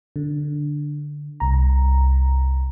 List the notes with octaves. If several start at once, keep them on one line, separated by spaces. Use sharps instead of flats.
D3
C2 A#5